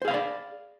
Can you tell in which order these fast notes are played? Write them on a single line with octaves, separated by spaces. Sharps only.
C5 G#4 F5 B5 D5